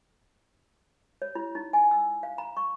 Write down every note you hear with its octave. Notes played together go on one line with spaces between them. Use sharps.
C#5
E4
D#4
G#5
E6
F5
A#5
C#6